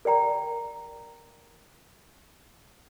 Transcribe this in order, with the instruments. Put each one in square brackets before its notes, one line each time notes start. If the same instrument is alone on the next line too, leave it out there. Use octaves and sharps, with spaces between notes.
[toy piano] A#4 D5 G5 A#5